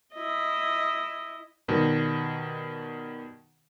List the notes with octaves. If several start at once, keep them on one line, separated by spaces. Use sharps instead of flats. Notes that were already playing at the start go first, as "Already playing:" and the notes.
E4 D#5
B2 D#3 G3